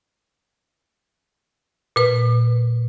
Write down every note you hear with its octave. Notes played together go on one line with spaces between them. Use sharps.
A#2 B4